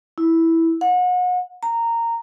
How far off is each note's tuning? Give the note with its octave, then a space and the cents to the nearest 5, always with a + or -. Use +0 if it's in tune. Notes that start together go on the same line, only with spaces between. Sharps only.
E4 -5
F#5 -35
A#5 -15